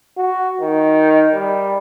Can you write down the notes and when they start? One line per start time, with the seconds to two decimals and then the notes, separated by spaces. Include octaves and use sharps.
0.17 F#4
0.61 D#3
1.33 G3